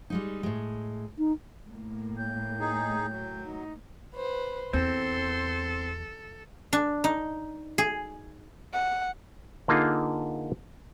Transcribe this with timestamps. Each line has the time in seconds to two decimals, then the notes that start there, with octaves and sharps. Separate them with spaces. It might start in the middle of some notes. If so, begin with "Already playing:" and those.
0.10 G3 G#3 D#4
0.43 A2 G#3
1.18 D#4
1.68 A2 A#3
2.17 C#5 G5 G6
2.60 D#4 G#4
3.11 F#3
3.43 D#4
4.14 B4 C5
4.73 E2 C4 A4 C6
6.73 D4
7.04 D#4
7.78 G#4
8.73 F#5
9.68 D3 A#3 D#4 F4 G#4